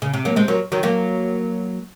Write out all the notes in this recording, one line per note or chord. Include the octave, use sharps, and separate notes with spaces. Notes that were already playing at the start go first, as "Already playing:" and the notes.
C#3
C3
F#3 A#3
G#3 C4
F#3 A#3
D#3 F#3
F#3 A#3